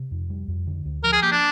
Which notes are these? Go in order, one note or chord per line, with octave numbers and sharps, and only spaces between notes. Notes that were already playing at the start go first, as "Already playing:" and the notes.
Already playing: C3
F2
G3
F2
D3
D2
F3 A#4
G#4
A#3 G4
D4